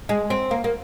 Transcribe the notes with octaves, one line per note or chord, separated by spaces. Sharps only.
G#3
C4
A#3
A#3